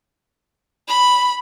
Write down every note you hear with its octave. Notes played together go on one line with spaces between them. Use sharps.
B5